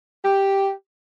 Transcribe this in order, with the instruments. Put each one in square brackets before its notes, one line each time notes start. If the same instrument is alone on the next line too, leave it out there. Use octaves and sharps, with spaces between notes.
[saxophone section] G4